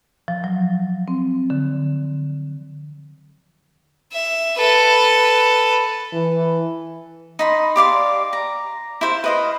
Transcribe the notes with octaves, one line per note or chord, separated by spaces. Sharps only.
F3
F#3
C4
D3
E5
A4 B4
E3
D#4 B5 C6
G4 D5 F5 C6
A#5
E4 C5 F5
B4 D#5 F5